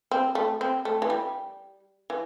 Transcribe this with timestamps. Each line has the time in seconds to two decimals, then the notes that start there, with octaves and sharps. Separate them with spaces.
0.11 C4
0.35 A3
0.61 C4
0.85 A3
1.02 E3
1.10 G3
2.10 E3